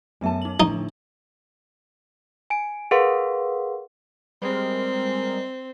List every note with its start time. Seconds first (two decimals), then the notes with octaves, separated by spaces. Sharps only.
0.21 F#2 A3 B3 E5 A5
0.42 D#4 F#7
0.60 A2 D3 F3 D4 D#4
2.50 G#5 D7
2.91 G#4 A#4 B4 F5 F#5 C6
4.42 G3 G#3 C4 A#4